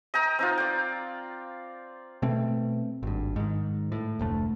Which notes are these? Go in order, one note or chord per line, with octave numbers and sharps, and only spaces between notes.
D#5 G5 A#5
C4 D#4 F4
D5 G5
B2 A3 C4
G#1 G2
G#2 D#3
A2
F1 D2 A3